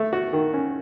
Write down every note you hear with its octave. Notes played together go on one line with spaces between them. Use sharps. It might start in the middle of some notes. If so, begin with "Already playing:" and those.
Already playing: A3
F#4
D#3
C#4